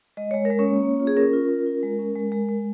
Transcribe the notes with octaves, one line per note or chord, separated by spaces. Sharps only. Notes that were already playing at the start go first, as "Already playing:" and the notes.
G#3 D#5
G#3 C#5
A#4
G#3
C#4 C#5
A#3
A#3
F4
G#4
C#4 A#4
F4
C#4
F4
G#3
C#4
G#3
G#3
G#3